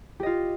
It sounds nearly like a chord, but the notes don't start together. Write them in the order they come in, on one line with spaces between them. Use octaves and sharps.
G4 D#5 F4